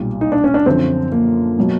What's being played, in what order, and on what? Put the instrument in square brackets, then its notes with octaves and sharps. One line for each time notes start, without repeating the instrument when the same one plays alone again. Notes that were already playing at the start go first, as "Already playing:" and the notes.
Already playing: [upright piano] B1 A#2 G3
[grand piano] D#4
D4
C#4
D4
[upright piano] F#2 D3 F3 [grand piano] C4
[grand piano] A#3
[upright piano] B2 F#3